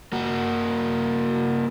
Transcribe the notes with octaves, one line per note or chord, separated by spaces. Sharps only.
A#3 F#4